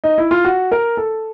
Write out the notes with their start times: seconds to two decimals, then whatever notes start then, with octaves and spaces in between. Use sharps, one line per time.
0.04 D#4
0.18 E4
0.31 F4
0.45 F#4
0.72 A#4
0.97 A4